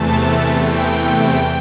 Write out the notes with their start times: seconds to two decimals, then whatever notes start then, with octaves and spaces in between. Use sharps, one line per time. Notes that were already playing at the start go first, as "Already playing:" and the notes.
Already playing: E2 C3 E3 A3 A5
0.56 G5